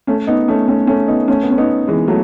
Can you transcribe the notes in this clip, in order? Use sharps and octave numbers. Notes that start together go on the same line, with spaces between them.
A3 C#4
B3 D#4
A3 C#4
A3 C#4
A3 C#4
B3 D#4
A3 C#4
B3
C#4
B3 D#4
E3 G#3
F#3 A3